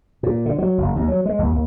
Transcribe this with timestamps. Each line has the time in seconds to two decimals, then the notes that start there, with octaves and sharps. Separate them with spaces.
0.23 A#2
0.46 D3
0.58 F#3
0.78 F#1
0.96 D#2
1.08 F#3
1.25 G#3
1.39 D#2
1.52 D#2